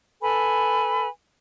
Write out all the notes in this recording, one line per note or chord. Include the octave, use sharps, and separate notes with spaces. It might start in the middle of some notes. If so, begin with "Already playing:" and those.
A4 B4 G#5 B5